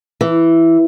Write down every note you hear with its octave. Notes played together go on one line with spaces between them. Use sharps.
E3